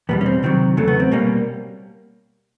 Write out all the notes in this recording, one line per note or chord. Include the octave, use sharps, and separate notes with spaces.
E2 B2 G3 B3
C#4
C4
C3 D#3 F#3 C4
E2 C#3 F#3 A3
B3
C4
B2 G3 A#3 C#4